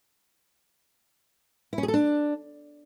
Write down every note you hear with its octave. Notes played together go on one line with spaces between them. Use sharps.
E4
C#4
G#4
A4
D4